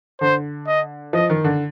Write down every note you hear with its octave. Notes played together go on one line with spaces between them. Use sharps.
D3 C5
D#5
F3 D#5
D#3
D3